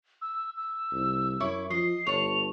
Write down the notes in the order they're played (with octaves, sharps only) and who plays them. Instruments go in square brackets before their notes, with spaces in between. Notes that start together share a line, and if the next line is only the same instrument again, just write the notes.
[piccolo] E6
E6
[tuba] C2
[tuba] F#2 [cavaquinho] E4 C#5 D6
[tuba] F3 [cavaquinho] D#5 [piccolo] C7
[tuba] G1 [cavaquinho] C#5 A5 [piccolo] F7